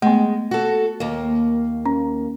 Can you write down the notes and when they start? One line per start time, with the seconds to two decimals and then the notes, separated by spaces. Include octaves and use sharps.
0.02 G#3 A3 B3
0.51 F#4 A4
1.00 D#2 A#3
1.86 C#4